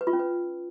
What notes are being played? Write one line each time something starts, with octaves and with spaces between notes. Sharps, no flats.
B4
F4
C#4
B4